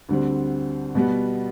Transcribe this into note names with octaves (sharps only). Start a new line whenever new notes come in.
D2 D3 G3 C4
B2 G3 B3